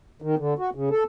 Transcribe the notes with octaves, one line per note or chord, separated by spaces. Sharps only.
D#3
D3
F#4
C#3
A4